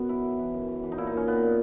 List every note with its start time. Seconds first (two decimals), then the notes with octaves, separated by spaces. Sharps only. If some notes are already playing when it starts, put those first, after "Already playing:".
Already playing: F#2 B2 B3
0.09 E3 E4
0.24 E3
0.39 E3
0.54 F#2
0.67 E3
0.83 E3
0.92 D#4
0.98 A#2 E4
1.07 D#4
1.12 A#2 C#4
1.27 A#2 B3
1.43 A#2